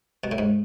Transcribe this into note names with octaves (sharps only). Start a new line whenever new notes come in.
B2
A2
G#2